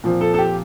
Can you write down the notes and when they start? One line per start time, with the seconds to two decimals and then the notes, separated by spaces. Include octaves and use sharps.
0.04 A#2 F3 C4
0.21 A4
0.34 A4
0.38 G4